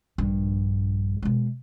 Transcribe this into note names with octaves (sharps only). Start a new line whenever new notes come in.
A#1 G2
B2 G#3